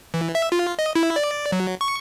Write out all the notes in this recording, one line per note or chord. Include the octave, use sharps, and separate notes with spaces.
E3
E5
F4
D#5
E4
D5
F#3
C#6